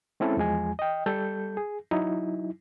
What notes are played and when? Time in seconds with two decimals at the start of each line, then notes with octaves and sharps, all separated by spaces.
0.20 G#3 C4 C#4 E4 A4
0.37 E2 F3 G#3 G#5
0.79 D#5 G5
1.06 G3 A4 G6
1.57 G#4
1.91 F#3 D#4 E4